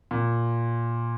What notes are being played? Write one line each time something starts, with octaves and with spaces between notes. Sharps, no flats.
A#2